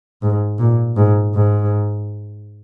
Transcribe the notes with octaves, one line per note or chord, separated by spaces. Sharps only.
G#2
A#2
G#2
G#2